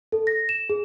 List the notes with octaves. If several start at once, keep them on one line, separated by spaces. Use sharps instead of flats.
A4
A#6
E7
G#4